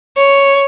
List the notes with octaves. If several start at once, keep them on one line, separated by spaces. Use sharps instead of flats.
C#5